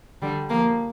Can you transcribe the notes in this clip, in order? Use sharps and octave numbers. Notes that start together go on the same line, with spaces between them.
D3 G3
F3 A#3